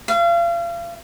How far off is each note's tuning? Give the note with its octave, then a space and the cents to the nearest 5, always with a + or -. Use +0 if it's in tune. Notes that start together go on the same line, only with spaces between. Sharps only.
F5 -35